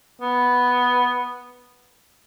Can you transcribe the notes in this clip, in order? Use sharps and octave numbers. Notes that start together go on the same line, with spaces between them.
B3